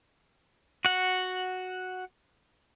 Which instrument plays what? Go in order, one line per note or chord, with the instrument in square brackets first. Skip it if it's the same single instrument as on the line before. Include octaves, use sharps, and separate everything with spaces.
[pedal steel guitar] F#4 F#5